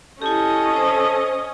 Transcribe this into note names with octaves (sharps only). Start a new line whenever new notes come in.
C#4 E4 G4 A4 D#5
C5